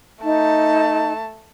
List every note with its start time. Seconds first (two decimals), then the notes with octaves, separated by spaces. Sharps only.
0.23 A3 D#4 A5